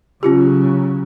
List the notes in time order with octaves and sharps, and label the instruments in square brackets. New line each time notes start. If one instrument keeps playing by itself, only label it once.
[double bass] C#3 F#3 [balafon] C#4 F4 G4